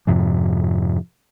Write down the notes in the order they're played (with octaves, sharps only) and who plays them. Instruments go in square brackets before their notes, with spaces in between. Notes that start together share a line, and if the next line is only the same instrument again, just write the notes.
[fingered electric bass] F2 G#2 C3 F3